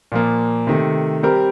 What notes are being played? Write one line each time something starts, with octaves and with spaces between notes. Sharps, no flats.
A#2 F3 A#3
C3 D#3 A3
G3 C4 G4 A#4